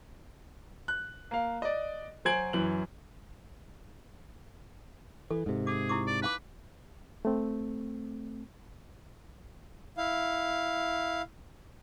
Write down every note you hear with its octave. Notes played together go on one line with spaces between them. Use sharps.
F#6
A#3 F5
D5 D#5
F#3 C5 G#5 G#6 D7 F#7
F#2 E3 F#7
E3 A4
G#2 C3
G#4 D6
E4 C#6 D6
D5
D#4 B4 F5 D6
A3 C4
E4 F5